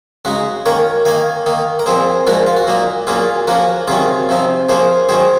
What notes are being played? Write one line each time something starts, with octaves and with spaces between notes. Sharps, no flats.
C#3 G#3 D#4 F#4
D#3 A#3 C#4 A#4 C#5
D#3 A#3 D#4 F5 G#5
D#3 A#3 D#4
A#4
A#2 F3 C4 G#4 C5
A#2 F3 G#3 D#4 F#4 A#4
F4
F#4
A#2 F#3 A#3 D#4
A#2 F#3 A#3 C#4 F4 G#4
F3 A#3 C#4 F#4 A#4
C3 D#3 F#3 C#4 F4 G#4
C3 F3 C4 D#4
F3 A#3 C#4 G#4 C5
D#3 F#3 C#4 G#4 C5